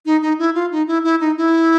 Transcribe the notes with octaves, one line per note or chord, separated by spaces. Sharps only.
D#4
D#4
E4
F4
D#4
E4
E4
D#4
E4